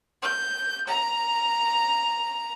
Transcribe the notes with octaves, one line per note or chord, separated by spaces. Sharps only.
G6
A#5